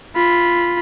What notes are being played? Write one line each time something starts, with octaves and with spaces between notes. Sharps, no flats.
F4 B5